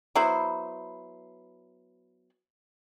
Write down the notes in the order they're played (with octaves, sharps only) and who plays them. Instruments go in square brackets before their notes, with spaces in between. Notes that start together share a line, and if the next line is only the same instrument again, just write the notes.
[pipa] F#3 B3 E4 C5